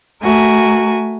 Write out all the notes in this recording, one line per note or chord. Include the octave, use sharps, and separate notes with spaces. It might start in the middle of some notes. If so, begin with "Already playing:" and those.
A3 F#4 A#4 G#5